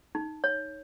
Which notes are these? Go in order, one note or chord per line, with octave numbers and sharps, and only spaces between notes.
D#4
C#5